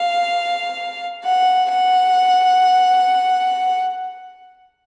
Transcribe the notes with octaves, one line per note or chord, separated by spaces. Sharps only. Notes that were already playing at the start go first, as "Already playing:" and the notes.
Already playing: F5
F#5
F#5